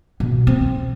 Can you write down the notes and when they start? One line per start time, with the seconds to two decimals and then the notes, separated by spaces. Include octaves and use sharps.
0.20 B2
0.47 C4